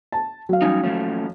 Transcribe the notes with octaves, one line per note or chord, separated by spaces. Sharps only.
A5
F#3 F5
G3 C#4 D#4
F3 A3 C#4